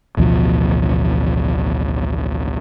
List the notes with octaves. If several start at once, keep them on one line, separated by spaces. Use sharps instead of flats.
A1 D2 B2 F3